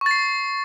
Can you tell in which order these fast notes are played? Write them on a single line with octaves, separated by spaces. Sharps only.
C#6 A6 C7